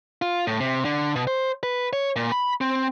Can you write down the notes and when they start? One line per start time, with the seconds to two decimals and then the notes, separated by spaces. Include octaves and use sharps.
0.22 F4
0.47 A2
0.60 C3
0.85 D3
1.15 B2
1.27 C5
1.63 B4
1.93 C#5
2.16 A#2
2.32 B5
2.61 C4